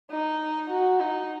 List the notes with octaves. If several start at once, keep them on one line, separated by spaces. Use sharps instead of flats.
D#4
F#4
D#4